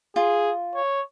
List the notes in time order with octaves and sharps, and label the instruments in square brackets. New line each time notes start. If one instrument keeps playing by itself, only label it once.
[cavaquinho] F4 [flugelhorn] G#4
[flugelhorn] C#5